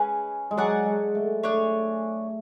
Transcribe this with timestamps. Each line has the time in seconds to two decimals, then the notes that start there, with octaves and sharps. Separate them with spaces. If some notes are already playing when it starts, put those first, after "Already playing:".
Already playing: G#3 C#4 G#4 B4
0.51 G#3
0.57 F#3 G#4 D5 F#5 A5
0.86 G#3
1.15 A3
1.43 A3 D4 G#4 C#5